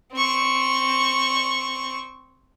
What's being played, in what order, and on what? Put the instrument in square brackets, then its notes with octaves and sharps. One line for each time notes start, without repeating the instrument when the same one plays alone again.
[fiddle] C4 C#6